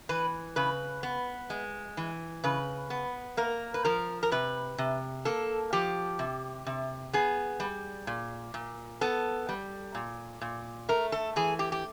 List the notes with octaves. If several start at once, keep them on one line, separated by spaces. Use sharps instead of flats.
E3 B4
C#3 B4
B3
G#3
E3
C#3 B4
B3
A#3 A#4
B4
F3 A#4
A#4
C3 B4
C3
A#3 A4
F3 G4
C3
C3
B3 G#4
G3
A#2
A#2
B3 A4
G3
A#2
A#2
A3 A#4
A4
E3 G#4
G4
G4